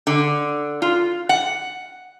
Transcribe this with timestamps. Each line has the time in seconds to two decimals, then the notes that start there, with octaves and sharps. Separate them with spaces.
0.07 D3
0.82 F4
1.29 F#5